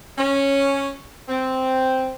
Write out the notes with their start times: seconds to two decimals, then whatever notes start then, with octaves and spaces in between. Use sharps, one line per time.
0.18 C#4
1.29 C4